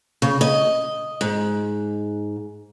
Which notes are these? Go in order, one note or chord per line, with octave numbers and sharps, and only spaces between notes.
C#3
D#5
G#2